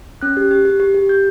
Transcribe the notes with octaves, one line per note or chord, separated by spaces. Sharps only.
C#4 F#6
G4
G4
G4
G4
G4
G4 G6